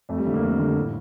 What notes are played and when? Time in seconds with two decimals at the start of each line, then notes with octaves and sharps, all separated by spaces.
0.09 F2 A3
0.18 G3
0.26 D3 A3
0.34 A#3
0.42 F2 A3
0.59 D3 G3
0.77 A2